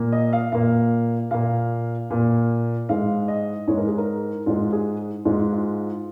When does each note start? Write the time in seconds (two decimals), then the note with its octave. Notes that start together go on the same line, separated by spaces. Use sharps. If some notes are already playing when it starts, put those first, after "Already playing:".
Already playing: A#2 A#3
0.12 D#5
0.33 F5
0.52 A#2 A#3 F5
1.31 A#2 A#3 F5
2.10 A#2 A#3
2.89 G#2 G#3 F5
3.28 D#5
3.68 G#2 G#3 C#5
3.78 A#4
3.88 G#4
3.98 A#4
4.46 G#2 G#3 F4
4.73 G#4
5.25 G#2 G#3 F4
5.52 F4